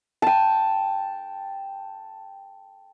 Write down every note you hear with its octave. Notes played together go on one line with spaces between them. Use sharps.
G5 A5